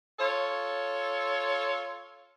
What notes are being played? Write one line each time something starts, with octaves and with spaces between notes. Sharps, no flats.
F4 A4 C#5